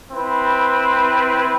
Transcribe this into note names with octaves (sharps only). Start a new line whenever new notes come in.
C4 E4 B4